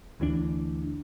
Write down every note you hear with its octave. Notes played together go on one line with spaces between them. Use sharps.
D2 E3 F3 D4